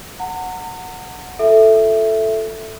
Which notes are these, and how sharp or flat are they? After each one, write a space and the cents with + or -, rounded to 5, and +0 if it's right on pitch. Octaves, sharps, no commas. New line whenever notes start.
F#5 -10 A#5 -40
F4 +0 A4 +0 E5 +0